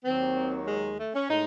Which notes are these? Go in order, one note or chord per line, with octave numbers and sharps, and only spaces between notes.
D#2 D#3 F#3 C4
G#3
A3
C#4
A2 G#3 D#4